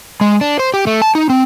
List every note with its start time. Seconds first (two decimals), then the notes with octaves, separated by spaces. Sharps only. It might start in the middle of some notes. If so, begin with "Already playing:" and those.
0.21 G#3
0.41 D4
0.59 C5
0.74 G4
0.87 A3
1.02 A5
1.15 D#4
1.30 C4